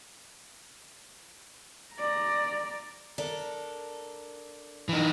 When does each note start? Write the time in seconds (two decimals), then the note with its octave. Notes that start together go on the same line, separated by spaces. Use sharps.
1.95 D5 A#5
3.18 D4 A4 A#4
4.89 E3 D#4